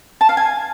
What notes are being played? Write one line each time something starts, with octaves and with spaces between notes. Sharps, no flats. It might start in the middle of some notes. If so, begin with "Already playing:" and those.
A5
F5
G#5